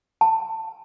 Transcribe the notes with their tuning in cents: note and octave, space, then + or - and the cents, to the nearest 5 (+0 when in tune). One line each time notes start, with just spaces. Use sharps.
A5 +15